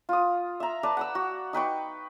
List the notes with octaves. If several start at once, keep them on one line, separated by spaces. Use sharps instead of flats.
F4 D#6
E5 A#5
B4 D5 A5
F#5 A#5 E6
F#4
D#4 B4 G5 C#6